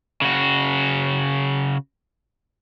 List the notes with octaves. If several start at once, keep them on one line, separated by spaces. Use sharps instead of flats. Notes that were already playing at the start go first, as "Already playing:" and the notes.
C#3 F#4